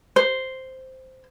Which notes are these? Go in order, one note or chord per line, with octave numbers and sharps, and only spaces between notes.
C5